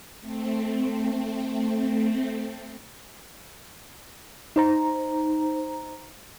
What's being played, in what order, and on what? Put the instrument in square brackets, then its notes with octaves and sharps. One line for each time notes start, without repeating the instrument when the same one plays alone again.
[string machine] A3 C4
[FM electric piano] D#4 C5 A#5